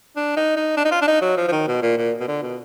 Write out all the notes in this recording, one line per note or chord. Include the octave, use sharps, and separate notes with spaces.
D4
D#4
D#4
D4
D#4
F4
D4
D#4
F#3
F3
F3
D#3
B2
A#2
A#2
B2
D3
B2